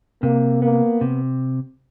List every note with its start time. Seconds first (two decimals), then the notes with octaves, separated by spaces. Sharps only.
0.23 C3 A#3
0.62 A#3 B3
1.01 C3